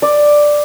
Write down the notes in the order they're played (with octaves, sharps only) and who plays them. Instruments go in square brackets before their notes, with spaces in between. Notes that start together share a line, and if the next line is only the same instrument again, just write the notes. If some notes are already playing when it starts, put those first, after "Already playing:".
[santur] D5